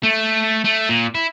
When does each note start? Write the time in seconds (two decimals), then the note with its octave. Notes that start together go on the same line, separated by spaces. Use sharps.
0.03 A3
0.65 A3
0.89 A#2
1.15 E4